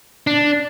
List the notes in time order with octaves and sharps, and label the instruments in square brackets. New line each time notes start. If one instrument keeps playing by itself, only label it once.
[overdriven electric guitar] D4